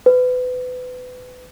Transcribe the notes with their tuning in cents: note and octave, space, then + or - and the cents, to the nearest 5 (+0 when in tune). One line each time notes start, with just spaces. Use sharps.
B4 +30